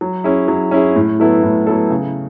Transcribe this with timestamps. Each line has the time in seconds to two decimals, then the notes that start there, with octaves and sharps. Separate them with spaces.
0.01 F#3
0.24 C#4 E4 G#4
0.48 F#3
0.71 C#4 E4 G#4
0.96 A2
1.20 F#3 B3 E4 A4
1.43 A2
1.67 F#3 B3 E4 A4
1.90 C#3